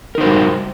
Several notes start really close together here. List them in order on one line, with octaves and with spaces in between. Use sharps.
A#4 D#4 C5 F#4 G3